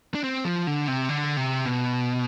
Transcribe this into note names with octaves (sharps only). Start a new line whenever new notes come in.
D4
C4
F3
D3
C3
D3
C3
B2